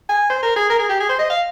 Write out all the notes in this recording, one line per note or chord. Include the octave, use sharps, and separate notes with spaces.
G#5
C5
A#4
G#4
A#4
G#4
G4
G#4
C5
D#5
F5